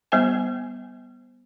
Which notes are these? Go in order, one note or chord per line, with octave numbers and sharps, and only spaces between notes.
G3 B3 C5 G#5